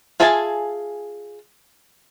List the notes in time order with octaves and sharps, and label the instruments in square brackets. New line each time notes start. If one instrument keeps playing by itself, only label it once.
[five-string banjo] F4 G#4 E5 G#5 A5